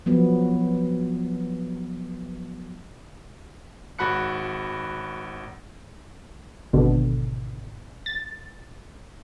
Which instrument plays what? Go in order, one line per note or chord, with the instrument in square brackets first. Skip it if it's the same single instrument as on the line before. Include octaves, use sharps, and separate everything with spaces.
[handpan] F3 F#3 B3
[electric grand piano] G#1 F#4 B5 F#6 C#7
[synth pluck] G#1 B2 D3
A6